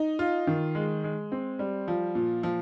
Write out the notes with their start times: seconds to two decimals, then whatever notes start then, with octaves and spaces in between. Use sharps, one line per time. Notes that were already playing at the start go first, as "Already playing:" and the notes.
Already playing: D#4
0.19 F4
0.47 D#3
0.75 G#3
1.04 G#3
1.32 C4
1.59 G3
1.88 F3
2.15 A#2
2.43 F3